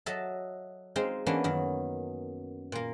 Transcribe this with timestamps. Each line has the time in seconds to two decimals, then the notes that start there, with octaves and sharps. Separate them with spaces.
0.06 F#3 A4 D#5 E5 A5
0.96 G#3 C4 D#4 F4
1.26 E3 A#3 B3 C#4 D4
1.44 F#2 D#3
2.72 A#2 A#3